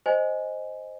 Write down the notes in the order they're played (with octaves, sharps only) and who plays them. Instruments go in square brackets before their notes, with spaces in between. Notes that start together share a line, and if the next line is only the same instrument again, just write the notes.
[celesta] C5 D#5 G#5